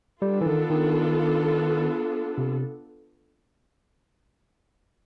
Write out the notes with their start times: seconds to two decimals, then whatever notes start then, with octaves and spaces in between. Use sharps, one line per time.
0.22 G3 B3 D4 F4 A4
0.41 E3
0.46 D#3
0.70 D#3
2.38 C3